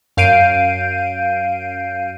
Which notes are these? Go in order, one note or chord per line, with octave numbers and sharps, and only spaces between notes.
F#2 F5 G6 C7 D7 D#7